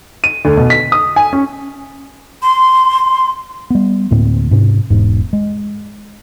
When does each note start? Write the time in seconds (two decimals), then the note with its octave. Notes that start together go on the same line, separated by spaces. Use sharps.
0.24 D#7
0.45 D2
0.57 B2
0.70 B6
0.92 D#6
1.16 G#5
1.33 C#4
2.42 C6
3.70 G3 B3
4.11 D2 A2 A#3 C4
4.51 G#2 C3 C#4
4.90 E1 G#2
5.33 G#3